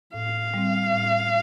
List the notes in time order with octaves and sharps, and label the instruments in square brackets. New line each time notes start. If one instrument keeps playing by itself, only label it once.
[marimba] A2 [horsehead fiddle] F5
[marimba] G3 C4
A2